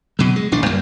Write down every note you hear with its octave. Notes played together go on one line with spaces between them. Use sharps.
B2 F#3
G#3
D#1 A#1 D4
F#2 G3 A#3